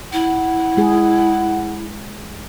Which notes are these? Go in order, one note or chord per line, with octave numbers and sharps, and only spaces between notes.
E4 F#5
G#3 G#4